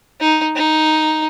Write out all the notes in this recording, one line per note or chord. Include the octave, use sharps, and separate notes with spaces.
D#4
D#4